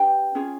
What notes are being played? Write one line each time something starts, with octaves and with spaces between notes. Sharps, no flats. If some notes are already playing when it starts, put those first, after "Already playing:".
Already playing: D4 G4 B4 G5
C#4 F4 G#4